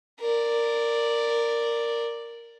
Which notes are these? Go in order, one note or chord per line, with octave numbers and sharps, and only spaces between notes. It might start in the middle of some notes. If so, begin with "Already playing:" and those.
A#4 D5